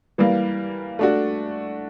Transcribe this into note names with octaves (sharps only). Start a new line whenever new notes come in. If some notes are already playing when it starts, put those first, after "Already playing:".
E3 G3 A#3
A3 D4 F#4